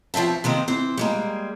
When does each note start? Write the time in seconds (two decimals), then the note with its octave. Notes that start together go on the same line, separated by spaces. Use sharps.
0.14 B2 F3 C4 E5 A5
0.44 C3 D#3 A#3 C4
0.68 E3 C4 C5
0.98 G3 G#3 A#3